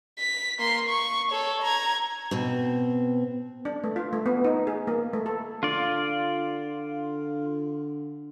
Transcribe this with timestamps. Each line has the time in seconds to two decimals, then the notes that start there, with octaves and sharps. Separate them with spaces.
0.18 B6
0.59 A#3 C6
0.89 C#6
1.31 A4 C#5
1.62 A#5 G#6
2.31 B2 C4
3.65 D4
3.84 A3
3.96 F4
4.13 A3
4.26 B3
4.45 D#4
4.67 G#4
4.87 A#3
5.13 A3
5.26 A4
5.63 D3 F4 D5